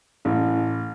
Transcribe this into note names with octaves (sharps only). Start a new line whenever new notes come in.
A1